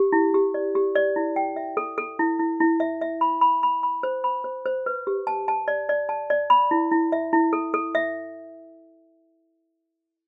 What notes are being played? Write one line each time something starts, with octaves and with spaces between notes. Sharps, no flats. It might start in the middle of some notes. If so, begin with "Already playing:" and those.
Already playing: G4
E4
G4
D5
G4
D5
E4
G5
E5
A4
A4
E4
E4
E4
E5
E5
B5
B5
B5
B5
C5
B5
C5
C5
B4
G4
A5
A5
D5
D5
A5
D5
B5
E4
E4
E5
E4
A4
A4
E5